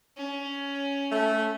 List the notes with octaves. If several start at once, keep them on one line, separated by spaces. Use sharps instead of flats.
C#4
A3